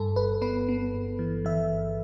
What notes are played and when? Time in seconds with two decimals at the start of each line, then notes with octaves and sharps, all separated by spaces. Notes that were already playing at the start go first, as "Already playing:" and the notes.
Already playing: G2 A4
0.16 G1 B4
0.42 B3 B4
0.68 B3
0.94 G1
1.19 E3
1.45 E3 E5
1.71 G1